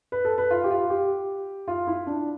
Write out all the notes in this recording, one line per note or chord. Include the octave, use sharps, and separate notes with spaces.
B4
A4
B4
F4
G4
F4
G4
F4
E4
D4